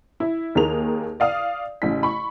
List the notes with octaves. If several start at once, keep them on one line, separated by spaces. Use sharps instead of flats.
E4
D#2 D#3 A#3 G#4 F7
D5 F5 D#6
A1 C#3 B6
B5 C#6